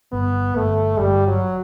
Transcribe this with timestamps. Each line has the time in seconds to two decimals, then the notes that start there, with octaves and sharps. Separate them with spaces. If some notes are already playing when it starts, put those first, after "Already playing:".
0.12 G1 B3
0.55 G1 A3
0.99 G1 G3
1.27 F#3